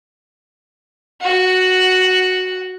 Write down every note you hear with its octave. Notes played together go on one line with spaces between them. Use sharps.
F#4 F#5